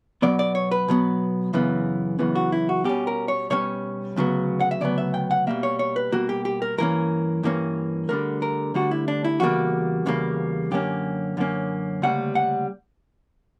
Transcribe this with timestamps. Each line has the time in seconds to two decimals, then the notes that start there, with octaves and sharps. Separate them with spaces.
0.22 B2 F#3 B3 D5
0.39 D5
0.55 C#5
0.71 B4
0.88 B2 F#3 B3
1.53 F#2 C#3 E3 B3
2.19 F#2 C#3 E3 B3
2.35 F#4
2.52 E4
2.69 F#4
2.84 B2 G3 C#4 G4
3.07 A#4
3.28 C#5
3.50 B2 G3 C#4 C#5
4.16 D2 C#3 F#3 B3
4.60 F#5
4.71 E5
4.81 D2 C#3 F#3 B3 D5
4.98 E5
5.14 G5
5.31 F#5
5.47 B2 G3 A#3 E5
5.63 C#5
5.79 C#5
5.96 B4
6.12 B2 G3 A#3 F#4
6.29 G4
6.45 G4
6.62 A#4
6.78 G2 E3 A#3 C#4 A#4
7.43 G2 E3 A#3 C#4
8.09 D2 D3 G3 A#4
8.42 A#4
8.74 D2 D3 G3 F#4
8.91 E4
9.08 D4
9.24 E4
9.40 E2 C#3 G3 A#3 F#4
10.06 E2 C#3 G3 A#3
10.71 F#2 D3 A#3 C#4 G4
11.37 F#2 D3 A#3 C#4
12.02 D2 C#3 G3 A#3 F#5
12.35 F#5